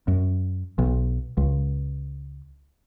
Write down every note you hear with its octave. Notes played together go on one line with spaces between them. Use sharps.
F#2
B1
C#2